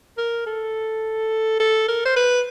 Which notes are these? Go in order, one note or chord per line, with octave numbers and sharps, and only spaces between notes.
A#4
A4
A4
A#4
C5
B4